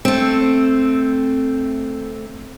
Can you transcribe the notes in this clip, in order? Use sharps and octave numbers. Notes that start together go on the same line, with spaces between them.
A3 C4